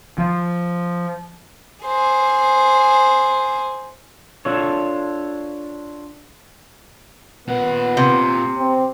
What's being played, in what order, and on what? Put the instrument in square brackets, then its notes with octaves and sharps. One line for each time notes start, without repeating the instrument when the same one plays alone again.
[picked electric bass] F3
[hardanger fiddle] G#4 C5
[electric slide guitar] D4 F4 A4 C#5
[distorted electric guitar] A#2 F#5 [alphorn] B3
[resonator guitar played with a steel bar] C3
[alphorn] C4